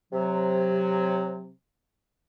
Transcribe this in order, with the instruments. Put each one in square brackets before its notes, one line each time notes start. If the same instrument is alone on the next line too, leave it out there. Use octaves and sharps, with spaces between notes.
[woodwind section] C3 F#3